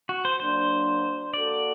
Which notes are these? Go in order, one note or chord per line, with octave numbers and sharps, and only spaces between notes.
F#4
C5
F#3 A#3 D4 C5
A#3 F#4 A4 D5